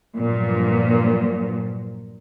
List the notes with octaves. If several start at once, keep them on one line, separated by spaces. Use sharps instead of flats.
G2 A#2 F3 F#3